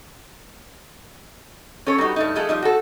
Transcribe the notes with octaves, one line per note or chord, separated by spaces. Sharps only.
C#4 A4 C#5
G3 B3 D#4 F#4
G2 A3 D#4
F3 G#3 A3 A4
F3 G3 D#4
F#4 A4